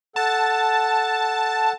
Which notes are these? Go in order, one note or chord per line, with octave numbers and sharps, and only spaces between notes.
A4 F#5 A5